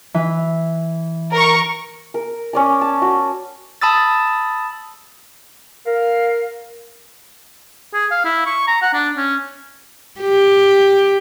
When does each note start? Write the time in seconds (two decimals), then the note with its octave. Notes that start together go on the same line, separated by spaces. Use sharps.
0.14 E3
1.33 A#4 C#6
2.14 A#4
2.53 C#4 D5 A#5
2.81 A5
3.02 F#4
3.82 A5 B5 D#6 E6 A6
5.87 A#4 F5
7.94 G#4
8.11 F5
8.25 E4
8.46 C#6
8.67 A#5
8.82 F#5
8.94 D4
9.17 C#4
10.21 G4